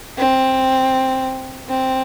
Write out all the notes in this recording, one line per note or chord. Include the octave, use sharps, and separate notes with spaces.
C4
C4